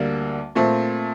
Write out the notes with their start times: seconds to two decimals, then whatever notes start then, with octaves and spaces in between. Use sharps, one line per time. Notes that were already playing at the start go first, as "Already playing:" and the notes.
Already playing: D2 D3 G3 A#3
0.55 A#2 A3 C4